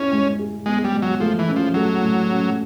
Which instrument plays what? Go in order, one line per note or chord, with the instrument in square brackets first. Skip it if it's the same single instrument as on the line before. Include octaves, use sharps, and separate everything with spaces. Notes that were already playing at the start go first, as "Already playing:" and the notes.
Already playing: [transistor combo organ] C#4 [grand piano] E4 G#4
[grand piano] G#3
G#4
[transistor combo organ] G#3 [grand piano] B3
[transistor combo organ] G3
[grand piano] G#3
[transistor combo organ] F#3
[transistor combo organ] F3 [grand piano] A3
[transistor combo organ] E3
[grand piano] C#4
[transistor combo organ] F3
[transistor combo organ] F#3 [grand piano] A3
[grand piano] A2
C#4